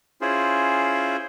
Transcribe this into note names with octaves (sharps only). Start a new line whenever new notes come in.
C#4 E4 F4 G#4 C5